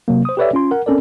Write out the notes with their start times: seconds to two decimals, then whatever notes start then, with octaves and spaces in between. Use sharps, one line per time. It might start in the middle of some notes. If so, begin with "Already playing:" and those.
0.08 C3 F#3 A#3
0.25 C5 D#6
0.37 G4 A4 B4 C#5 D5 E5
0.53 C#4 F4 C6
0.71 A#4 F#5
0.86 C4 C#4 A4 A#4 D5